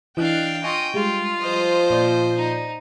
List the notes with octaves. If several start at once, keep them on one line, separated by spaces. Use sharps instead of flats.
E3 D4 D#5 F5 G5 F#6
F4 D#5 G#5 C#6
G3 G#3 F4
F3 C5 D#5
A#2 D5 G6
D#4